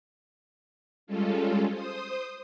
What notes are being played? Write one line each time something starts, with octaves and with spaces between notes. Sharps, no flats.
G3 G#3 C#4 F4 A4
C5 D#6